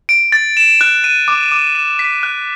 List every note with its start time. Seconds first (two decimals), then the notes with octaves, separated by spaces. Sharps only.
0.09 D7
0.32 A6
0.57 E7
0.81 F#6
1.04 D#7
1.28 D6
1.52 D6
1.75 E7
1.99 B6
2.23 F#6